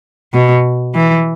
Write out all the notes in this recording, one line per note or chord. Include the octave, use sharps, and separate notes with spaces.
B2
E3